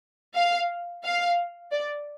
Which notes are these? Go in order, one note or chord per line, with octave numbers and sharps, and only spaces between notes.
F5
F5
D5